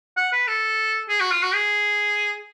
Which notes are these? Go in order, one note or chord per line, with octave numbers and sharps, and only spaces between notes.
F#5
B4
A4
G#4
F#4
F4
F#4
G#4